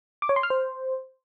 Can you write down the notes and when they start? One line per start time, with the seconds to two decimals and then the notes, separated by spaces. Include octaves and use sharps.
0.22 D6
0.29 C#5
0.36 C6
0.43 F6
0.50 C5